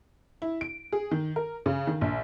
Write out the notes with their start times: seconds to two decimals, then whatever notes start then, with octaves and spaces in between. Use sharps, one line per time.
0.42 E4
0.61 D7
0.92 G#4
1.11 D#3
1.36 A#4
1.66 C#3
1.87 D#3
2.01 A#1